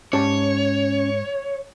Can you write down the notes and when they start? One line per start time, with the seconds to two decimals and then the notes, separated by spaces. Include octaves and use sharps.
0.13 G#2 C#4 G4 C#5 A5